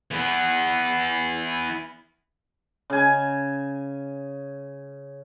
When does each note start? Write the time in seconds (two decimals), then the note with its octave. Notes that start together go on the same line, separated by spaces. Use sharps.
0.11 E3 B3
2.90 C#3 G#5